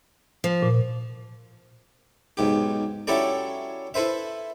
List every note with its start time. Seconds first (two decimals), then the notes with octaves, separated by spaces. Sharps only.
0.44 F3
0.62 A#2
2.37 B1 G#2 G4
3.07 F#3 C#4 E4 G4 A4 D5
3.94 E4 A4 B4 C5 E5